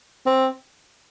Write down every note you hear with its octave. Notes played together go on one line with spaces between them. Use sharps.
C4